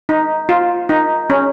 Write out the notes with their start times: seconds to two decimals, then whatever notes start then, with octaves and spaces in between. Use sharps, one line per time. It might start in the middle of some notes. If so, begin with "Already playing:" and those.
0.09 D#4
0.49 F4
0.89 D#4
1.30 C#4